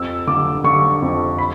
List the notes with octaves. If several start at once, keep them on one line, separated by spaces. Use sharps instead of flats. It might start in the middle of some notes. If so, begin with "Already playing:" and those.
Already playing: F2 E6
D3 D6
D3 C#6
F2
B5